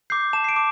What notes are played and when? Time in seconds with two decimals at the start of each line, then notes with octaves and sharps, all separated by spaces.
0.10 D6 G6 C7
0.33 A5 E7
0.44 C7
0.49 D7
0.56 D6